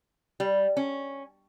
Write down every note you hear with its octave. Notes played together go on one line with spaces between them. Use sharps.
G3
C#4